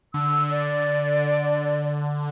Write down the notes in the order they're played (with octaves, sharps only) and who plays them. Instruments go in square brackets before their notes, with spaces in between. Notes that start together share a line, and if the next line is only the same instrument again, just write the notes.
[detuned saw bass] D3 [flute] E6
[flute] D5